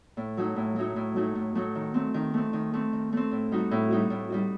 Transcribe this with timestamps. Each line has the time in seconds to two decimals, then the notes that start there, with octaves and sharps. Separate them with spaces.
0.17 A2
0.37 F#3 A3 D#4 F#4
0.56 A2
0.76 F#3 A3 D#4 F#4
0.96 A2
1.16 F#3 A3 D#4 F#4
1.35 A2
1.55 F#3 A3 D#4 F#4
1.75 D#3
1.94 A3 C4
2.14 D#3
2.34 A3 C4
2.53 D#3
2.73 A3 C4
2.93 D#3
3.13 A3 C4
3.31 A2
3.51 G3 D#4 F#4
3.71 A2
3.90 G3 D#4 F#4
4.10 A2
4.30 G3 D#4 F#4